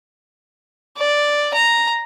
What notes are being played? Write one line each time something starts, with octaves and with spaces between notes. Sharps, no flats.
D5
A#5